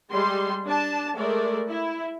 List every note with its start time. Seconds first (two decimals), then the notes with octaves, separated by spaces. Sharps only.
0.11 G3 G#3 C6
0.66 D4 A5
1.16 G#3 A3 A4 A#4 D5
1.70 E4